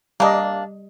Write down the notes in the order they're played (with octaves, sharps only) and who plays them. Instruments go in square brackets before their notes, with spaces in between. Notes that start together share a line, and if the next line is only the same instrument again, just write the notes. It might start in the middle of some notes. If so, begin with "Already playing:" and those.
[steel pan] G3 D#5 [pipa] A#3 D4